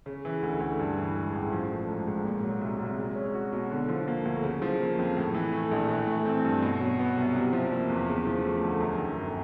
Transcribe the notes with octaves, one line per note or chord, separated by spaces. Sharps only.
C#3
E3
D2
D2
G2
E3
G#3
A1
F3
A3
G#2
G#2
A#2
F#3
C2
C2
G#3
C#4
F#4
B2
D3
F3
A#3
D2
C#3
F3
A#3
F2
A2
E3
A3
A#1
E3
A3
C4
G2
B2
F#3
B3
C2
C3
F3
A#3
E2
C#3
F3
A3
D2
F#2
D#3
G1